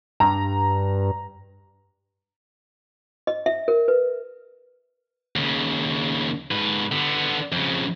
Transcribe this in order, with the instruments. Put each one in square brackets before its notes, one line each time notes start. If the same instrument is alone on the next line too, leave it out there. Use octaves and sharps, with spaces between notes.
[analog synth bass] G2 [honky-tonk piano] A#5
[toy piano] D#5
E5
A#4
B4
[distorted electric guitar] D#2 C#3
G#2 B4
D3 B3
F2 C#3